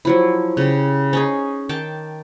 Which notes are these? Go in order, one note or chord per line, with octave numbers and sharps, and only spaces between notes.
F3 F#3 E4
C#3 G4
C#4 D#4 G#4
D#3 G5 A5 D6